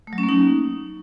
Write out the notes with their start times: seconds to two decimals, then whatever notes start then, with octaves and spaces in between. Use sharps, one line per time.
0.07 A3
0.13 F#3
0.18 C#4
0.23 A#3
0.29 D#4